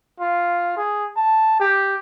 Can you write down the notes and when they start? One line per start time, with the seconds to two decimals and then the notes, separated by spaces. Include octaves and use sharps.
0.20 F4
0.77 G#4
1.16 A5
1.60 G4